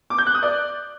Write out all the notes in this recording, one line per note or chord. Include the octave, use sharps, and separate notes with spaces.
D6
G6
F#6
D#6
D5